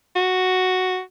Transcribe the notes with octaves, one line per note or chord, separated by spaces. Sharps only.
F#4